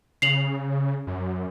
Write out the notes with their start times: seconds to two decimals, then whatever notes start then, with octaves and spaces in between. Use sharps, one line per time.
0.22 C#3 C7 F7 F#7
1.07 F#2